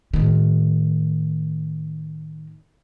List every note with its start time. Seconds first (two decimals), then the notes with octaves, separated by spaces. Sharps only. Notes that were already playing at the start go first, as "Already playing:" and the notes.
0.14 A2 D#3